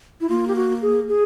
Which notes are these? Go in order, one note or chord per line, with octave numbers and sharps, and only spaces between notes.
E4
A#3 F4
G4
F#4
G#4
G#4